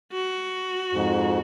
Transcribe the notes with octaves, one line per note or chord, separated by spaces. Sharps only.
F#4
F2 G#2